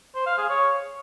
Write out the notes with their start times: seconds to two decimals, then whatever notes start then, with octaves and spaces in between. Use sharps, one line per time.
0.15 C5
0.26 F5
0.38 G#4
0.49 C#5